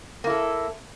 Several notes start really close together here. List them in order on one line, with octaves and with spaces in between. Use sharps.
A#3 E4 A4